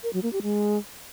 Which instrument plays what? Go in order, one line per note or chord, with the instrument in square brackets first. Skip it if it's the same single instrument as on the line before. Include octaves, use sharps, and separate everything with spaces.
[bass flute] A#4
F#3
A#3
G4
G#3